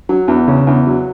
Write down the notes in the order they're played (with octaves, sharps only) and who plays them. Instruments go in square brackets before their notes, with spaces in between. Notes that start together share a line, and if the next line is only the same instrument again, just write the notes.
[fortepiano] F#3
E2
C#3
E2
F#3